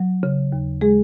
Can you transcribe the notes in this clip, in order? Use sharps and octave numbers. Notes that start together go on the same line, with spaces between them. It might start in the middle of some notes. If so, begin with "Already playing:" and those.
Already playing: F#3
C#3
D#2
G#3 G#4